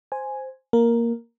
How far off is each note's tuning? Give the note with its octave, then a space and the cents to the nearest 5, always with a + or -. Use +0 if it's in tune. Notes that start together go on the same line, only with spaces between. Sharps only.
C5 +0 G#5 +0
A#3 +0 A#4 +0